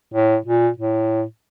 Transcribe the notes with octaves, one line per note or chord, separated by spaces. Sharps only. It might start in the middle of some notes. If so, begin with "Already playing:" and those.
A2
A#2
A2